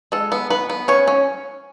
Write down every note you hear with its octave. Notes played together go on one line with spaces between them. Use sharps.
G#3 A4
B3
B3 B4
B3
C#4 C#5
C#4